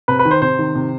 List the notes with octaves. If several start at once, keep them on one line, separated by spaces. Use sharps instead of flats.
C3 B4
B4
D#3
C5
C3 C5
D#3
C3